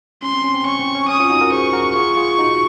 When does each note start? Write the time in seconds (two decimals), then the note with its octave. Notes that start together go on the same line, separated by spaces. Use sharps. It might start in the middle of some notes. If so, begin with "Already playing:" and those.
0.22 C#4 C6
0.33 C4
0.44 C#4
0.54 C4
0.65 C#4 C#6
0.80 C4
0.95 C#4
1.08 C#4 D#6
1.20 C#4 F4
1.30 D#4 F#4
1.41 F#4 A#4
1.52 G#4 C5 C#6
1.73 F#4 A#4
1.95 F4 G#4 C#6
2.17 F4 G#4
2.38 D#4 F#4